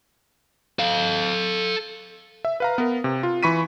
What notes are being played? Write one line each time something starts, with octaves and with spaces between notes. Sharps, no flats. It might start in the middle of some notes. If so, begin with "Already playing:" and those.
A4 F5
E5
B4 F5 A#5
B3 A#4
C3
F4
E3 B5 C#6 B6 D#7